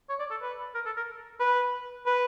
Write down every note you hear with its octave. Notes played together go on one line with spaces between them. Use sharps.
C#5
D5
A4
B4
A#4
A4
A#4
B4
B4